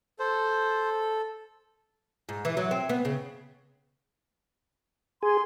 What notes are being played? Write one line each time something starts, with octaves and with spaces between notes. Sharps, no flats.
A4 C5
G#2
E3
F#3
C4
B3
C#3
G#4 C6